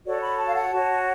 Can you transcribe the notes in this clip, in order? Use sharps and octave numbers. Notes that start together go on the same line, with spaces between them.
F#4 A4 C#5 D5
B5
A5
F5
F#5
F#4 A5
C#5